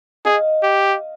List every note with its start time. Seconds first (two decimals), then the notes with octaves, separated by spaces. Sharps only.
0.25 G#4 D#5 F5
0.63 G4